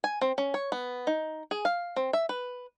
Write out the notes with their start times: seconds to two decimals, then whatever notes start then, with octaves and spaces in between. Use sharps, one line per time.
0.04 G#5
0.21 C4
0.38 C#4
0.54 C#5
0.72 B3
1.07 D#4
1.51 G#4
1.65 F5
1.96 C4
2.13 E5
2.29 B4